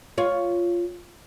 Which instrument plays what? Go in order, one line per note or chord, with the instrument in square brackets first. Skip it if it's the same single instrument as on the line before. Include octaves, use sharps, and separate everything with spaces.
[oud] F4 C#5